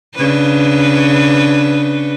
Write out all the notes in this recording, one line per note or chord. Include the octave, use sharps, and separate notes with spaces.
C#3 D4 B4